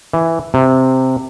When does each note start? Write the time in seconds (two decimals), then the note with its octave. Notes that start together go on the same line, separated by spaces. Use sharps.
0.13 E3
0.54 C3